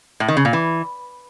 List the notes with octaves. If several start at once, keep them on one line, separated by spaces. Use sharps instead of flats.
A2
D#3
C#3
A#2
E3